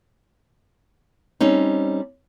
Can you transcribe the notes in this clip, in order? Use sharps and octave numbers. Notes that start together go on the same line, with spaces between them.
G3 C4 C#4 D#4